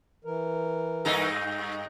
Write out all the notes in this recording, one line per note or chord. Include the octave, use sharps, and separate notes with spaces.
E3 A#4
G2 D#4 A4